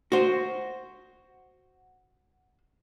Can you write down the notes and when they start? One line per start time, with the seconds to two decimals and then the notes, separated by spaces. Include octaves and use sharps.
0.12 F#4 C5